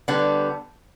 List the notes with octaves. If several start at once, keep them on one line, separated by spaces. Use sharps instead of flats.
D3 G3 B3